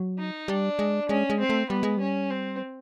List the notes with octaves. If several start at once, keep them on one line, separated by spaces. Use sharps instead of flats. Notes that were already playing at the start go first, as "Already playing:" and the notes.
Already playing: F#3
D#4
G3 D4
G#3
G#3 C#4
G#3
C4
A3
G3 B3
G#3
G3 C#4
C4